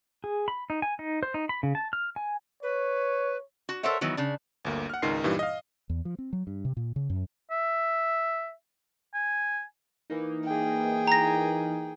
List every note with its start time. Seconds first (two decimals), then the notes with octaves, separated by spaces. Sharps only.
0.24 G#4
0.48 B5
0.70 D#4
0.82 G#5
0.99 D#4
1.23 C5
1.34 D#4
1.49 B5
1.63 C#3
1.75 A5
1.93 F6
2.16 G#5
2.63 B4 C#5
3.69 F#4
3.83 A4 A#4 C5 C#5 E5 F#5
4.01 D#3 E3 F#3 B3
4.17 C#3 D4
4.65 G1 D2 A#3
4.90 F#5 F6
5.02 G#1 C#2 D#4 A#4 C6 C7
5.24 G2 A#2 E3 G3 D#4
5.39 D#5 F5
5.90 E2
6.05 F3
6.19 C4
6.33 F#3
6.47 G2
6.65 C3
6.77 A#2
6.96 C#3
7.10 F#2
7.51 E5
9.14 G#5
10.10 E3 A#3 D#4
10.45 G#4 G5
11.07 A#5 A#6